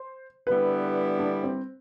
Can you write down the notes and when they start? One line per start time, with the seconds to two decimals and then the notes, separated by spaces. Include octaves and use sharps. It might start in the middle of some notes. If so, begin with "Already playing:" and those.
Already playing: C5
0.47 D3 G3 B3 E4 B4
1.19 D4
1.44 C4